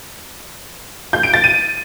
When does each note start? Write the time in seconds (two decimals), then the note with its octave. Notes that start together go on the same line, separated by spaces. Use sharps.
1.13 G6
1.23 D7
1.34 A6
1.44 D#7